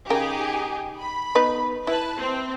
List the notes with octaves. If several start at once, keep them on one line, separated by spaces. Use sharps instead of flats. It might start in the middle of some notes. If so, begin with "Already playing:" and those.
C#3 D#4 G4 G#4 A#4 G5
B5
B3 D#4 B4
E4 B4 A5
C4 C5